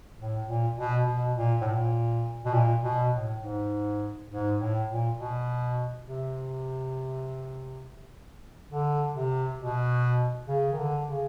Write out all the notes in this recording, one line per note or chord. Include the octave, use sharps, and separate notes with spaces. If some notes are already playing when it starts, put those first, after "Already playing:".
A2
A#2
B2
B2
A#2
A2
A#2
B2
A#2
B2
A2
G#2
G#2
A2
A#2
B2
C3
D3
C3
B2
C#3
D#3
D3
C#3